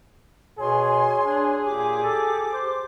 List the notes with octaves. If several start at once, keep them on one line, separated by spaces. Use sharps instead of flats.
B2 G#4 C#5 G#5 C6
D4
A#2 G4 D6
A4
C5